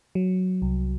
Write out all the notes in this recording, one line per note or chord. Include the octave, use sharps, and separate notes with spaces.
F#3
C2